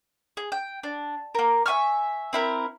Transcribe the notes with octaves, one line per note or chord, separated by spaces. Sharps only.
G#4
G5
D4
A#3 A#4
E5 G#5 C#6 F6
C4 E4 A#4